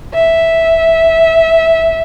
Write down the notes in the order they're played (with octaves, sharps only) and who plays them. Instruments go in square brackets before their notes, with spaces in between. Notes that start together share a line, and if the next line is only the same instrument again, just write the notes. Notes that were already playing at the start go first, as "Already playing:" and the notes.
[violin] E5